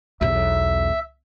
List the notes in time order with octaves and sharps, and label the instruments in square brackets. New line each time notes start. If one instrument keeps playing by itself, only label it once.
[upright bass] B1 E2 [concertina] E5